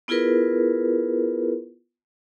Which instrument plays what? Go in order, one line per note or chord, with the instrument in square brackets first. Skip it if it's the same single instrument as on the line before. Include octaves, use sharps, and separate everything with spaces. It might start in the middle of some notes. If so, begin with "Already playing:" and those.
[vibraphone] B3 E4 F4 G#4 A#4 B4